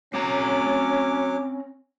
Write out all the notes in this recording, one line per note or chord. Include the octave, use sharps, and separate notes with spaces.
F#3 C4 C#4 F#5 A#5 D6